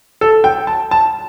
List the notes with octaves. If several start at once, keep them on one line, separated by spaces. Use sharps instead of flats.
A4
G5
A5
A5